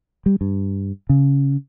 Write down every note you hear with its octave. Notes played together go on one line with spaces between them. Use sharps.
G3
G2
C#3